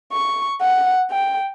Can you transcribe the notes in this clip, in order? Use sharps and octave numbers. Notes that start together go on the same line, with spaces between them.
C#6
F#5
G5